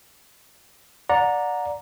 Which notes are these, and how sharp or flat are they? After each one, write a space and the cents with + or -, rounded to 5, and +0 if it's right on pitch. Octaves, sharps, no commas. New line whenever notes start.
D5 +0 F#5 -30 A#5 +0